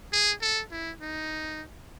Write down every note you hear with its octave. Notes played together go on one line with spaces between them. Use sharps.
G#4
A4
E4
D#4